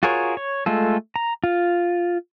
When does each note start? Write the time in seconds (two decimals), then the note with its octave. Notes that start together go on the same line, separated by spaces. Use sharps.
0.03 F4 F#4 G#4 A#4 C#5
0.37 C#5
0.66 G#3 A3 F4 A4
1.16 A#5
1.44 F4